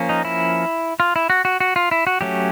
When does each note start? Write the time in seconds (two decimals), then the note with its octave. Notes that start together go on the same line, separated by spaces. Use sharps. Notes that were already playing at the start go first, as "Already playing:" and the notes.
Already playing: F3 A#3 C#4
0.09 D#4
0.25 E4
1.00 F4
1.16 E4
1.30 F#4
1.45 F#4
1.60 F#4
1.76 F4
1.91 E4
2.07 F#4
2.21 F#3 A3 C#4 G4